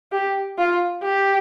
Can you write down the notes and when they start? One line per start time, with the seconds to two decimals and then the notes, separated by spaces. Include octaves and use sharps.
0.12 G4
0.58 F4
1.03 G4